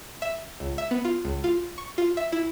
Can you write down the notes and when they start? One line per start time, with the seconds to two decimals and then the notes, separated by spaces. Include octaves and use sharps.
0.22 E5
0.60 C#2
0.78 E5
0.91 B3
1.05 F4
1.25 C#2
1.44 F4
1.78 C#6
1.98 F4
2.17 E5
2.32 E4